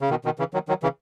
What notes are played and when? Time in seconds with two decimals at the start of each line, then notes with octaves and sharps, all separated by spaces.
0.01 C#3
0.10 B2 D#3
0.25 B2 D#3
0.39 C#3 E3
0.54 D#3 F#3
0.68 D#3 F#3
0.83 C#3 E3